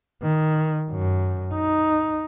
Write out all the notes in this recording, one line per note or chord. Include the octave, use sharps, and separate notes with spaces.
D#3
F#2
D#4